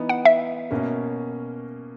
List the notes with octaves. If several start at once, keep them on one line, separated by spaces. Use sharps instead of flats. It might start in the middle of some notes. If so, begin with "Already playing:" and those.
Already playing: E3 B3 D#4
F#5
E5
B2 A#3 C#4